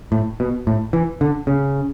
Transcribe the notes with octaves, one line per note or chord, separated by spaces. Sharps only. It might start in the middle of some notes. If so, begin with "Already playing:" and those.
A2
B2
A2
E3
D3
C#3